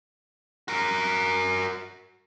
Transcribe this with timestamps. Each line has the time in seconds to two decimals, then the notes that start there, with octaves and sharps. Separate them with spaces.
0.68 F#4 A#4